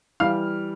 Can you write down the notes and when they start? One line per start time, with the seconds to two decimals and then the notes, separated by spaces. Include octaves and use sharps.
0.20 E3 G3 F5 F6